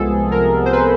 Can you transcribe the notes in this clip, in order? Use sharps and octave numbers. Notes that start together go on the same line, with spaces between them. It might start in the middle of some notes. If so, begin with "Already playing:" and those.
Already playing: C2 C3 F3 G#3 B3 G#4 A4
A#4
C5
B4